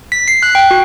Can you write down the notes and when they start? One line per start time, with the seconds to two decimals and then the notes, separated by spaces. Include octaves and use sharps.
0.12 B6
0.28 C7
0.43 F#6
0.55 G5
0.71 F#4